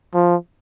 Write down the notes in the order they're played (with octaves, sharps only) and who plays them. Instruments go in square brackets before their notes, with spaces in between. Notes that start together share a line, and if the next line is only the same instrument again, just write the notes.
[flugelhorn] F3